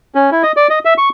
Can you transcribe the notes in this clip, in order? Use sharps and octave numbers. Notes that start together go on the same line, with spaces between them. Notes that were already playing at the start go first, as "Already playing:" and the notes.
C#4
E4
D#5
D5
D#5
E5
C#6